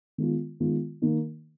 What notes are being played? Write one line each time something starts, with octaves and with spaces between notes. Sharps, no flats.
D#3 G#3 B3 F4
D#3 G#3 B3 F4
D#3 A#3 D#4